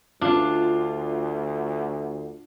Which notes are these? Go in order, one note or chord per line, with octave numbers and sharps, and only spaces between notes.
D2 D4 F4